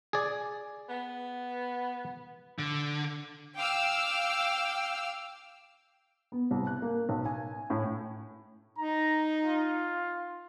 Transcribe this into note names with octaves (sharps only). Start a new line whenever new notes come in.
G#4 D5
B3
D3
F5 G5 D6 E6 F6
B3
C2
F#6
A#3
B1
G#5
A2
D#4 A#5
F4